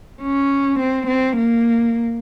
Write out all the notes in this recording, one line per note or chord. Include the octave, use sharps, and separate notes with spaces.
C#4
C4
C4
A#3